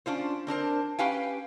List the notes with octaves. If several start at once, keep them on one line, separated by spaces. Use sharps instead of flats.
C#4 D4 F4 C5
C4 D4 A#4 C5
C#4 G4 B4 F5 G5 G#5